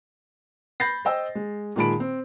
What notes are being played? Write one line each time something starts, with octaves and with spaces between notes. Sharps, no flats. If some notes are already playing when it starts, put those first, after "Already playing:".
B5 G6 A6 A#6 C7
C5 D#5 G5 E6
G#3
A#2 D#3 G#3 A5 B5 D7
C4